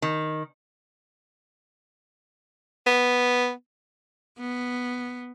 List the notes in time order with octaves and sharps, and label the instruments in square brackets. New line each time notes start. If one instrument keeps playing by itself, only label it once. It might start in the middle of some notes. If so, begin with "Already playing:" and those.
[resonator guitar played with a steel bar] D#3
[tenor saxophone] B3
[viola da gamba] B3